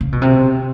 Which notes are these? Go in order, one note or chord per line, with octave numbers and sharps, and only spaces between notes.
C#3
B2
C3